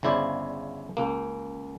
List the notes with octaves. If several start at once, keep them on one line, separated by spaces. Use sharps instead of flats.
G1 C#3 E4 C5 D5
C#2 A#3